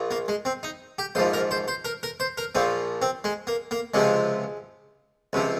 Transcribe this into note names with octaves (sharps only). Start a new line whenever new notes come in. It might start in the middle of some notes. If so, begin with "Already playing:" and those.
Already playing: A#1 A#2
A#3
G#3
C4
D#4
G4
A#1 G#2 F3 C5
A#4
C5
C5
A#4
A#4
C5
A#4
A#1 A#2 F3 C4
C4
G#3
A#3
A#3
C#2 C3 F3 G#3
C#2 C3 F3